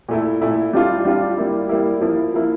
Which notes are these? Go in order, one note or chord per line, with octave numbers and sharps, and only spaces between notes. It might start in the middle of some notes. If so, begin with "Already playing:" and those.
A#2 A3 E4
A#2 A3 E4
G3 D4 F4
G3 D4 F4
G3 A#3 E4
G3 A#3 E4
F3 A#3 E4
F3 A#3 E4